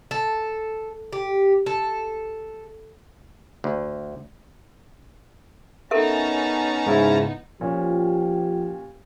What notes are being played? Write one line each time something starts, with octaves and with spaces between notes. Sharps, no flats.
A4
G4
A4
D2
B3 C#4 D#4 A4 A#4 E5 A5 A#5
G#2 C#3 E4
A#2 F3 C#4 G4